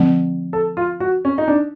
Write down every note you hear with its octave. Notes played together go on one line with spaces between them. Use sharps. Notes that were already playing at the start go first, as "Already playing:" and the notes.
Already playing: D3 F3 A3 C4
A4
F4
F#4
C#4
D#4
D4